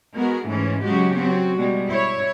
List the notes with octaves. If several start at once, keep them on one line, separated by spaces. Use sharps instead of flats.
G#3 B3 F#4 A#4
G#2 E3 A3 C#4
C#3 F#3 G#3 F#4 G4
F#3 C4 F#4
B2 G3 G#3
E4 C#5